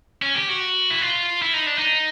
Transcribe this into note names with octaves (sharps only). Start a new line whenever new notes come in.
C#4
G4
F#4
E4
F4
E4
D#4
D4
D#4